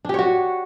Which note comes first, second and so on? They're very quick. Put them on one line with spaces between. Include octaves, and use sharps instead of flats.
D4 G4 C#5 F#4